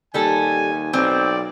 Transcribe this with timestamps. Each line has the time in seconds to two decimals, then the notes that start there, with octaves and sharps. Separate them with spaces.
0.14 D#2 G3 A4 G#5
0.93 B1 C4 D5